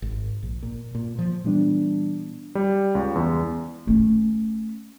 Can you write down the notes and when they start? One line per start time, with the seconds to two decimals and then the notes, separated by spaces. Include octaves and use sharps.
0.02 G#1
0.43 A#1
0.63 A#2
0.95 A#2
1.19 F3
1.44 A#2 E3 G3 B3 D4
2.55 G3
2.95 C#2
3.15 E2
3.87 A3 C#4